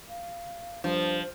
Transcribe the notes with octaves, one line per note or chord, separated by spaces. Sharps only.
F5
G2 F3 C5